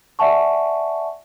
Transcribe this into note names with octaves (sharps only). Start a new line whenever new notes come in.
D5 E5 F#5 G#5 A5 C#6